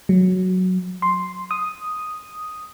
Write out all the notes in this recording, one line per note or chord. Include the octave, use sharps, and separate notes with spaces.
F#3
C6
D#6